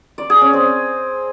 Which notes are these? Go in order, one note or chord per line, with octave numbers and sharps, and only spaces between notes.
D5
G#4
C#4
C4